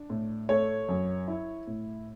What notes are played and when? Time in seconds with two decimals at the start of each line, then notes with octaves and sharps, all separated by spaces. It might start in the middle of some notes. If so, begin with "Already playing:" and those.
Already playing: D4
0.10 A2
0.49 A3 C#5
0.89 F#2
1.28 E4
1.67 A2